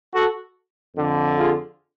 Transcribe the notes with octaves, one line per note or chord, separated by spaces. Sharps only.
F#4 A4
F2 D3
F4 G#4